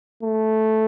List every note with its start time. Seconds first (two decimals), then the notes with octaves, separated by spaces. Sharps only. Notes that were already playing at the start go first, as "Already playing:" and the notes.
0.23 A3